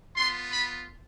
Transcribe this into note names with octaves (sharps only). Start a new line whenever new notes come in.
B3 F4 C6
B5